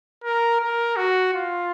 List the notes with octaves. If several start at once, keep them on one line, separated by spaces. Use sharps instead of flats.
A#4
A#4
F#4
F4